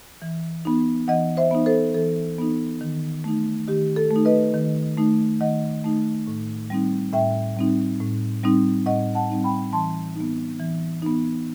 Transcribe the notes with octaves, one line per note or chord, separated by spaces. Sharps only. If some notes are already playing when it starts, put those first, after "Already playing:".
E3
B3 D#4
E3 D#5 F#5
C5 E5
B3 D#4
A4 C5
E3 A4
B3 D#4
D#3
A3 D#4
D#3 G4
A4
A3
D#4
B4 D#5
D#3
A3 D#4
D#3 D#5 F#5
A3 D#4
A2
G3 C4 D#4
A2 E5 G5
G3 C4 D#4
A2
G3 C4 D#4
A2 D#5 F#5
F#5 A5
G3 C4 D#4
G5 B5
E3 A5 C6
B3 D#4
E3
B3 D#4